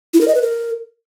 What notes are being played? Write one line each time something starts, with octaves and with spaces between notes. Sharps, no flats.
E4
A#4
D#5
B4
A#4